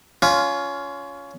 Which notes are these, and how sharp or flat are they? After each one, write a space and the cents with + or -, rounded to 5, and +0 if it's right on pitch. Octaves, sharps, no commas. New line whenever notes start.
C#4 +20 F4 +0